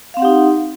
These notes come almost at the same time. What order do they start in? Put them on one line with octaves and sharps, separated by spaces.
F5 C4 F#5 G4 D#4